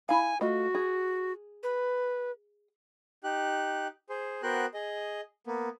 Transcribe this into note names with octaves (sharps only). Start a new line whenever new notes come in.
E4 F5 G#5
A3 F4 F#4 D#5
G#4
B4
D#4 G4 F#6
G#4 C5
B3 F#4 A#4 C5 G5 F#6
G#4 D#5
A#3 B3